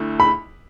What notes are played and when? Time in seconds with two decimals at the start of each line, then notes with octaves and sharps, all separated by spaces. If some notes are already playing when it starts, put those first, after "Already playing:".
Already playing: D2 D3 A3 E4
0.20 B5